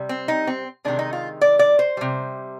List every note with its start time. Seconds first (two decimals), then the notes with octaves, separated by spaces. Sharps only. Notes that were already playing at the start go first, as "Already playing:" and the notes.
Already playing: C3 G3
0.09 C4
0.28 D#4
0.47 C4
0.85 C3 D#3 G#3 D4
0.99 D#4
1.13 F4
1.41 D5
1.59 D5
1.79 C5
1.97 C3 G3